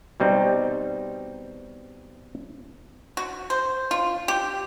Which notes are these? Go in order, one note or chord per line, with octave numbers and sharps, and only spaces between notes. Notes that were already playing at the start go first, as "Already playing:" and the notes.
B2 G3 C4 D#4
F#4
C5
F4
G4